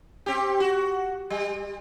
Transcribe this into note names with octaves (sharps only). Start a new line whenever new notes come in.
C4 G4
F#4
G3